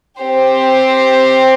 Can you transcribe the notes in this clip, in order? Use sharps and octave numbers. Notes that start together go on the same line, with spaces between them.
C4 G4 C5